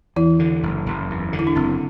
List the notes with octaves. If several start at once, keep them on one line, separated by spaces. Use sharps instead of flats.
E2 E3 E4
D3
F#1
F#1
E2
D3
E4
D4
F#1 C4